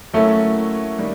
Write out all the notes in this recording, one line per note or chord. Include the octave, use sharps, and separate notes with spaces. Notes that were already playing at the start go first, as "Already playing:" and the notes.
F#3 A3 A#3 C#4 E4
D#3 G3 A#3